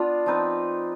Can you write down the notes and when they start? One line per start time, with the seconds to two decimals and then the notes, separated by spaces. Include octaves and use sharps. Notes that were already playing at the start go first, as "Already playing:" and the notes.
Already playing: B3 D4 F4
0.26 F3 C4 D#4 B4